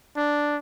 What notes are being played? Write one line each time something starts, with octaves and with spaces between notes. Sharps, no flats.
D4